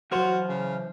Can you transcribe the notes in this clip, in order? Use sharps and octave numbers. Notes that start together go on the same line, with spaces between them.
E3 F#3 F#4 C5 C6 F6
C#3